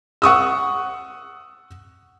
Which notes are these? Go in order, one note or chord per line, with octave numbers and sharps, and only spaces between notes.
F#5 C#6 D#6 E6